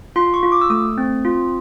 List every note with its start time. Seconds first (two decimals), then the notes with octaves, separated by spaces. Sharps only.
0.16 F4 C6
0.34 C#6
0.43 F4
0.52 D6
0.61 E6
0.70 A3 D#6
0.98 C4
1.25 F4